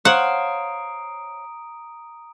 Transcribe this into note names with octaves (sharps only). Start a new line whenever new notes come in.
C5 C#5 F5 F#5 A#5 D#6 D7